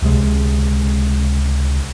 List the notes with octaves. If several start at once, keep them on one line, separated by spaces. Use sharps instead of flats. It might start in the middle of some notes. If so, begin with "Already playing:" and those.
C#2 C3 G#3